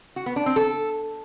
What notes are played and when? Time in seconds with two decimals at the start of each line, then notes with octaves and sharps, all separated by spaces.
0.16 F#4
0.26 B3
0.36 D4
0.46 C4
0.56 A4